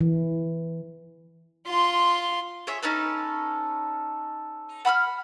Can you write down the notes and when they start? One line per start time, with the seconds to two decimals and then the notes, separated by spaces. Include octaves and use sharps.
0.01 E3
1.67 F4 C6
2.67 G#4 C#5 E5
2.83 C#4 D#4 A4 B4
4.85 F#5 B5 E6 F6